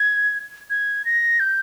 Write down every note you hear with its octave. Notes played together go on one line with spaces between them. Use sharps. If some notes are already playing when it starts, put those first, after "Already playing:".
Already playing: G#6
G#6
A#6
G6